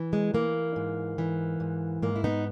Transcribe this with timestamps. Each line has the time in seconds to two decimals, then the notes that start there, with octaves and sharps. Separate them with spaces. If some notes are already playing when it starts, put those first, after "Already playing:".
Already playing: E3
0.13 G#3
0.34 E3 A#3
0.76 G#2
1.18 E3
1.60 G#2
2.02 G#2 A#3
2.16 E4
2.24 B3 D#4